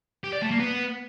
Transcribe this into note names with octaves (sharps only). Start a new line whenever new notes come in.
G4
D5
A3
A#3
B3